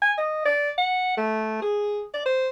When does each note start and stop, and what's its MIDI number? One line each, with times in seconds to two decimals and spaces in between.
0.02 0.12 80
0.18 0.45 75
0.45 0.70 74
0.78 1.16 78
1.17 1.61 57
1.62 2.02 68
2.14 2.21 74
2.26 2.49 72